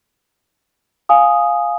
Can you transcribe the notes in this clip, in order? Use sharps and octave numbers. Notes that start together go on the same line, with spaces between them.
F5 G#5 D#6